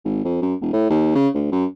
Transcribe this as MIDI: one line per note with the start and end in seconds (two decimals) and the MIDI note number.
0.05 0.24 32
0.25 0.40 41
0.42 0.54 42
0.61 0.72 28
0.73 0.86 45
0.90 1.14 39
1.15 1.28 49
1.34 1.51 38
1.52 1.65 42